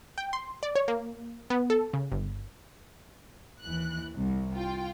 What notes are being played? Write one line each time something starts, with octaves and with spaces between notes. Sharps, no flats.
G5
C6
D5
C#5
A#3
B3
A4
C#3
G1
D#2 E3 F#6
C2
F4 G5